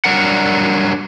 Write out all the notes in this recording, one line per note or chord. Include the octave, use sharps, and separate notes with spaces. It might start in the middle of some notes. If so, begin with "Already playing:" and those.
F#3 G3 D4 A#4 F#5